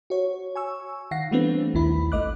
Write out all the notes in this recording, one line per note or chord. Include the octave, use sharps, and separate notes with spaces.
F#4 C#5
G#5 C#6 E6
D#3 F5 F#5 A#6 C7
E3 G3 A3 B3 C4 D4
A#1 D#2 D#3 E4 B5
A1 A3 D#5 D6 F#6